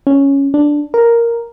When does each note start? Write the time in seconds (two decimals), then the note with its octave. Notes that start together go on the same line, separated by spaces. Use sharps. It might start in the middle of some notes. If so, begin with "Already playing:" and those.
0.07 C#4
0.54 D4
0.94 A#4